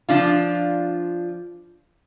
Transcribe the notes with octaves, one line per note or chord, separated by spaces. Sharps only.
F3 D4 F4